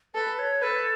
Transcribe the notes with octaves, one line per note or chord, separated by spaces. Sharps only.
A4 B4
C#5
A4 B4